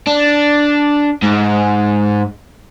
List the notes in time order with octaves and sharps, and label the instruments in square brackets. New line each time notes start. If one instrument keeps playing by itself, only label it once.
[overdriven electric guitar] D4
G#2